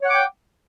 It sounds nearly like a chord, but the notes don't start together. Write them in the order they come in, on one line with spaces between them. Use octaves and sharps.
C#5 F#5 D6 G5